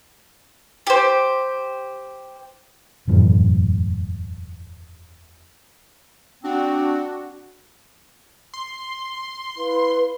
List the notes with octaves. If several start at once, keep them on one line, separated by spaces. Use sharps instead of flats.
G4 C5
E1 F#2 A2 E3
C4 D4 F#4
C6
E4 B4 F5